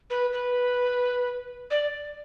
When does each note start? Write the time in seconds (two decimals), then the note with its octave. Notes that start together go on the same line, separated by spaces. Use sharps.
0.10 B4
0.33 B4
1.71 D5